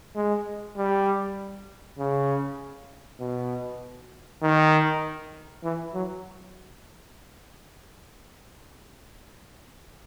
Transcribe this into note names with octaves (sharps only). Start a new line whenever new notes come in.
G#3
G3
C#3
B2
D#3
E3
F#3